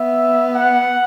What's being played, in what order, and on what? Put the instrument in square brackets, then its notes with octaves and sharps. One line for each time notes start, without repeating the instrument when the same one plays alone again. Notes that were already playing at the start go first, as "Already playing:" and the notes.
Already playing: [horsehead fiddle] B3 [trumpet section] E5
[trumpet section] F#5